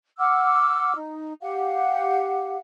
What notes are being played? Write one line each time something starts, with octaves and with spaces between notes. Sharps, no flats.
F#5 D6 E6 F6
D#4
G4 F5 F#5